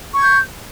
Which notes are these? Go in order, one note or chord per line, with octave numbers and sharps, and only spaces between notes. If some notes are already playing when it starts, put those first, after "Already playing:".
C#6 G6 G#6